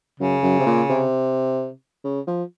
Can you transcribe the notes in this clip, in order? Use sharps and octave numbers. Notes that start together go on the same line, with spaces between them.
F#2 C#3
F#2
C3
A#2
C3
C#3
F3